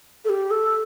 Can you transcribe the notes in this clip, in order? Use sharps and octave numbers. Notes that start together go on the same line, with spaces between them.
A4
G4
A4